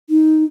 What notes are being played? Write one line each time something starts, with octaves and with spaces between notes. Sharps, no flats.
D#4